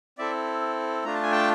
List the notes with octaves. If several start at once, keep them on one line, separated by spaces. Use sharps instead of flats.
C4 E4 A4 D5 E5
A3 D4 F4 A#5
A5
G#5
G5 A5